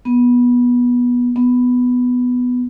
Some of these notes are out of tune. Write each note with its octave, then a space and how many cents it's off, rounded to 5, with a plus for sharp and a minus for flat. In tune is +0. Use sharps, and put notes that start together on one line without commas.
B3 -15
B3 +5